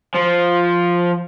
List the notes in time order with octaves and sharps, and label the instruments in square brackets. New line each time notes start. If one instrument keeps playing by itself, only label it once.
[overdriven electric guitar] F3